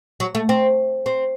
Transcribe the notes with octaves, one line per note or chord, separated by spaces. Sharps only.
F#3
A3
C4
C4